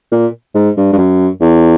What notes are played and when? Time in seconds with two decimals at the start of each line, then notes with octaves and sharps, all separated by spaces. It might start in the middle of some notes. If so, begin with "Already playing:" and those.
0.11 A#2
0.55 G#2
0.77 G2
0.93 G2
0.98 F#2
1.41 E2